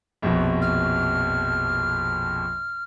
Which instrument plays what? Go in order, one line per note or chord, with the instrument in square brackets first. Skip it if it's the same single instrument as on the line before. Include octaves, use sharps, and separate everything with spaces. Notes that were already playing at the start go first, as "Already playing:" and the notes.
[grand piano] A#1 F2 B2
[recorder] F6